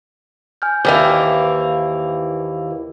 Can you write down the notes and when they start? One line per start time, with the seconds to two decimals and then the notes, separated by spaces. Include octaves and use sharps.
0.62 G#5 F6 G6
0.85 D#2 E3 A#3 B4 C5 E5